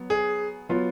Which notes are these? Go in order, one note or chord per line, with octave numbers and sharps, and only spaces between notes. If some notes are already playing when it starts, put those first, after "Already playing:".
Already playing: F#3 B3
G#4
F#3 B3 F4